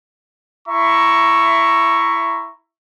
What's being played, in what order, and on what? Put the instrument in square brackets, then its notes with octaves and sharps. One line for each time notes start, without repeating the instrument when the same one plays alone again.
[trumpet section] E4 E5 A#5 C#6